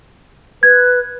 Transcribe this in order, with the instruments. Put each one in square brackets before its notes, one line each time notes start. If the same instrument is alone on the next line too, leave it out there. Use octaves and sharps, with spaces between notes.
[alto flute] B4 [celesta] G#6